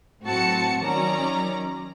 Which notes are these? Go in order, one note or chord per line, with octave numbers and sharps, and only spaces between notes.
A2 F#3 C4 F#4 A5 C#7
D#3 F#3 C#4 D5 A#5